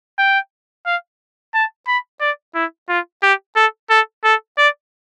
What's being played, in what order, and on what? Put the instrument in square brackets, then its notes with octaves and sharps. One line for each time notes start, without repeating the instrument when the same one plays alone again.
[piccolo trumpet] G5
F5
A5
B5
D5
E4
F4
G4
A4
A4
A4
D5